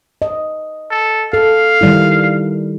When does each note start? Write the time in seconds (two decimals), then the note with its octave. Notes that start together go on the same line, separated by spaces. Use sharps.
0.22 D#5
0.91 A4
1.33 A4 F5
1.81 D#3 G3 E4